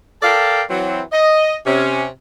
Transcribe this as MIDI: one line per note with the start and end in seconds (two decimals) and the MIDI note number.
0.23 0.62 69
0.23 0.62 70
0.23 0.62 74
0.23 0.62 77
0.23 0.62 79
0.23 0.62 81
0.70 1.01 52
0.70 1.01 54
0.70 1.01 60
1.12 1.55 75
1.66 2.06 48
1.66 2.06 61